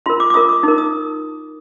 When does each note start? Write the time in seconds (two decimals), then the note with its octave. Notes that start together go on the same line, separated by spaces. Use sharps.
0.06 F4 A#4 C6
0.20 D6
0.30 D6
0.34 F4 A#4 D#6
0.49 D6
0.63 D#4 A#4 D6
0.78 D#6